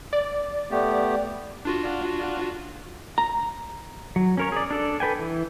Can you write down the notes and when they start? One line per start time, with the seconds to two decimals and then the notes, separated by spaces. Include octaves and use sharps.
0.13 D5
0.71 A3 B3 G4
1.65 D4 F4 F#4
3.18 A#5
4.16 F#3
4.37 C#4 A#4 C#5
4.52 G#4 D5
4.71 D4 A4 D5
5.00 A4 B4 G5 G#5
5.19 E3